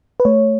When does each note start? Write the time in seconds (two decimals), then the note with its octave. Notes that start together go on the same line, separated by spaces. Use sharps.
0.20 B4
0.25 A3 C#5